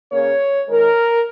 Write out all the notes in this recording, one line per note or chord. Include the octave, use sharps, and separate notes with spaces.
C#3 A#3 C#5
D#3 G#3 A#4